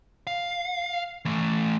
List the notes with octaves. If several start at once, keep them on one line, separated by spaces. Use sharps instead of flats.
F5
E3 A3